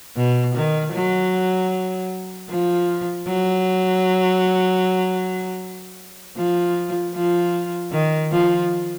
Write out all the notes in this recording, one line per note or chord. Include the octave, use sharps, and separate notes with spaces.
B2
D#3
F#3
F3
F#3
F3
F3
D#3
F3